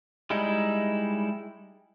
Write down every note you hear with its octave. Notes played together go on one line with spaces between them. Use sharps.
G3 G#3 D#4 E4